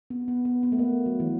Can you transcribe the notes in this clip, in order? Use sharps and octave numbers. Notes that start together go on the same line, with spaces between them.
B3
B3
B3
B3
A3
A#3
F#3
E3